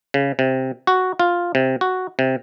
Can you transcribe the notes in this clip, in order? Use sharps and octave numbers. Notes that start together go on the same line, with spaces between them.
C#3
C3
F#4
F4
C3
F#4
C3